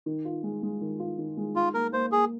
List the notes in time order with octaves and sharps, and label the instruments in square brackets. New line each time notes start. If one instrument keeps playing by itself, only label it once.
[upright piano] D#3
F4
G#3
G#3
D#3
F4
D#3
G#3
[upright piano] D#4 [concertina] F4
[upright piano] A#3 [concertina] A#4
[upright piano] A#3 [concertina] C5
[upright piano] A#3 [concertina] G#4